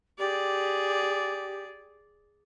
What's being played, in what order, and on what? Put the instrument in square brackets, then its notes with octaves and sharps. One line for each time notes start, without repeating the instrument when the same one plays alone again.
[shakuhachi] G4 [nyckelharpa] G#4 D5